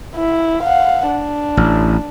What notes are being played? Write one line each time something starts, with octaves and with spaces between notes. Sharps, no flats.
E4
F5 F#5
D4
A1